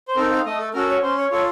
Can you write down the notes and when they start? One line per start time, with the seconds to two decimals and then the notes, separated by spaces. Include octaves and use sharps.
0.08 C5
0.16 C4 D#4 A4 A#4
0.32 F5
0.46 A3 D#5
0.59 A4
0.74 C#4 F#4 A4 A#4
0.89 C#5
1.02 C#4 C5
1.17 C#5
1.31 F4 A4 C#5